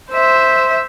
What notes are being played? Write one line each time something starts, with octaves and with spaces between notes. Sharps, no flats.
C5 E5